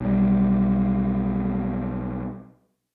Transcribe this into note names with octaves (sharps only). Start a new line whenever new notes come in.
B1 G3